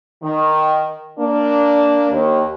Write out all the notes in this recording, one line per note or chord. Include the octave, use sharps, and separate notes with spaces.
D#3
A#3 D4
D#2